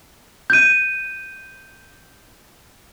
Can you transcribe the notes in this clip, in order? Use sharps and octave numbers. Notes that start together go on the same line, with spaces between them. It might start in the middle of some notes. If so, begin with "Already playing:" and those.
G6 D#7